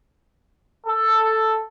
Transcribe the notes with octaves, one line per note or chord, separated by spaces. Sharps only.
A4